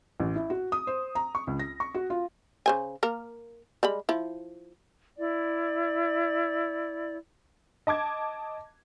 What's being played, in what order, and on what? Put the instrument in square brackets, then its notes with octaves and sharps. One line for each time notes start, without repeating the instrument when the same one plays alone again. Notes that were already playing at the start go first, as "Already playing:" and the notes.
[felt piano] A1
E4
F#4
D#6
C5
A#5
C#6
C#2
A#6
C#6
F#4
F4
[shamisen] C#3 C5 G#5
A#3 A#4
G3 G#3 B5
F3 E4
[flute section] E4 D5
[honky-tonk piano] D#5 A5 D6 G#6